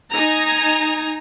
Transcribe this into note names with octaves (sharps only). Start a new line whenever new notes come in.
D#4 G#5 A#5